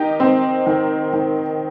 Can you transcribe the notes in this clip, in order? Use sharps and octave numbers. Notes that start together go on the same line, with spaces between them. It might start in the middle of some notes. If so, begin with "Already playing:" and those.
Already playing: D#3 D#4 G4
C4
D#3
D#3